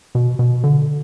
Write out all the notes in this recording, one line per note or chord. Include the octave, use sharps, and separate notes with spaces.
B2
B2
D3